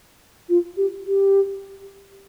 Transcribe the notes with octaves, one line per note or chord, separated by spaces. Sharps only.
F4
G4
G4